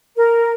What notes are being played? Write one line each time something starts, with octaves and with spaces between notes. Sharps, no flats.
A#4